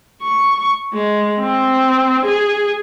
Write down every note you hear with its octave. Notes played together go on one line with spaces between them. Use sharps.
C#6
G#3
C4
G#4